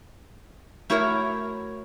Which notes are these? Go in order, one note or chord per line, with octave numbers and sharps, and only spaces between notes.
A3 E4 F#4 A#4 C#5